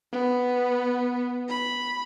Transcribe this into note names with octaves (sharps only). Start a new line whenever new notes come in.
B3
B5